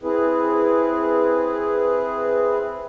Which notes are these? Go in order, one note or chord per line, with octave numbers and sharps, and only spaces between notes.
C4 E4 G#4 B4